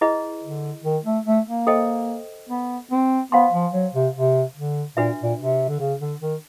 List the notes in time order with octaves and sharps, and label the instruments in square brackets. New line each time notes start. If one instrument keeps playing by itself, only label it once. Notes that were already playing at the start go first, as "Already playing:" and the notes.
[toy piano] E4 G#4 B4 D#5
[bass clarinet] D3
D#3
A3
A3
A#3
[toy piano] A4 C5 D#5 G5
[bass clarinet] B3
C4
[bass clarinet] B3 [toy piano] C5 F5 G#5 C6
[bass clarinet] F3
F#3
C3
C3
D3
[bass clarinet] A#2 [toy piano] D4 F#4 B4 E5
[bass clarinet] A#2
C3
D3
C#3
D3
D#3